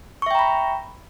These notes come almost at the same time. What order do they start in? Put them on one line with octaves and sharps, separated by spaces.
C#6 E5 G5 A#5 B5